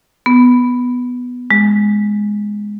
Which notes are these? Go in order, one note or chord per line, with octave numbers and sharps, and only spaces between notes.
B3
G#3